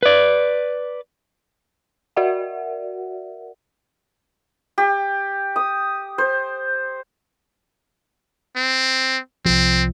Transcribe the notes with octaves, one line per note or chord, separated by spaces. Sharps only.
B4 D5
F#4 A#4 D5 E5 F#5
G4
D#6
C5
C4
C2 F3 C4